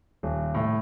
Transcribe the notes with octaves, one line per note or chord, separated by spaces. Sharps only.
D#1
A2